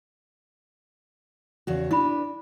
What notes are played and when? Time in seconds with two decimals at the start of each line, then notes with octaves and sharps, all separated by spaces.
1.67 E2 C#3 F#4
1.91 D4 E4 B4 B5